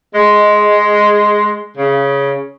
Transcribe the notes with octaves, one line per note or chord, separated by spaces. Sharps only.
G#3
C#3